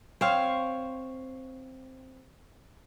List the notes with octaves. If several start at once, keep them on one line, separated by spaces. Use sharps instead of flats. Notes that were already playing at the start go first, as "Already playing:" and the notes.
C4 C5 C#5 F5